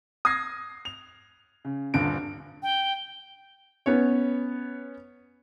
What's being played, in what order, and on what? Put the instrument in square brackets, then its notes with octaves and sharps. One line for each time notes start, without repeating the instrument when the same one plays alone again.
[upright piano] D#6 F6 G#6 A#6 C7
F7
C#3
D#1 G2 D3 D7
[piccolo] G5
[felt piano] B3 C#4 C#5